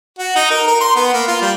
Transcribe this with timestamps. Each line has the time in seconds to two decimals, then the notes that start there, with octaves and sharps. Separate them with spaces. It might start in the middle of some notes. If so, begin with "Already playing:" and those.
0.19 F#4
0.36 D#4
0.51 A#4
0.67 A#4
0.81 C6
0.96 B3
1.14 A#3
1.28 F4
1.42 G3